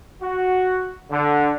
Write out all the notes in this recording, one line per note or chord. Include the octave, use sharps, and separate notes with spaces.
F#4
D3